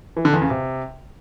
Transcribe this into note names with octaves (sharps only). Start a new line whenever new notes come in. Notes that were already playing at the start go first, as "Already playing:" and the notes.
E3
D3
E2
C#3
C3